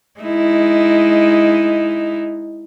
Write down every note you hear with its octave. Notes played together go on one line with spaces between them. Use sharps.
G#3 D#4 E4